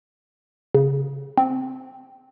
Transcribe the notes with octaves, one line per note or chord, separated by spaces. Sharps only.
C#3
C4